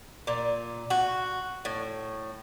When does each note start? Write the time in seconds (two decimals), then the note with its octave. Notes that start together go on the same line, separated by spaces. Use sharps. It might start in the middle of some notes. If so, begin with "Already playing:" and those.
0.27 A#2
0.90 F#4
1.65 A2